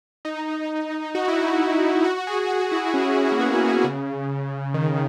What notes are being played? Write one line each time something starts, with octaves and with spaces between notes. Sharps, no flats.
D#4
F#4
E4
F#4
F#4
G#4
F#4
E4
C#4
A#3
B3
C#3
D#3